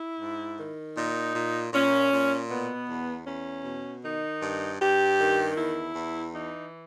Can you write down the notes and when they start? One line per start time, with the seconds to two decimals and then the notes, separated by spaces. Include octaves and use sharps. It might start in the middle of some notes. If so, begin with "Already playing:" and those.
Already playing: E4
0.20 G#2
0.58 D#3
0.96 A#2 D#4
1.35 A#2
1.73 A#2 C#4
2.12 A#2
2.50 B2 B3
2.88 E2
3.26 E2 C#4
3.65 B2
4.03 D#3 D#4
4.42 G2
4.80 G2 G4
5.18 D#3
5.56 E2 E4
5.95 E2
6.33 E3 D#4